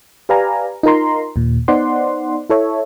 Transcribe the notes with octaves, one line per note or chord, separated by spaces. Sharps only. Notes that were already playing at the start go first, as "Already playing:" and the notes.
G4 B4 D5 F5 G#5 A#5
D#4 F4 A#4 A#5 C6
D#2 A#2
B3 D#4 C5 D5 F#5 C6
E4 A4 C#5 E5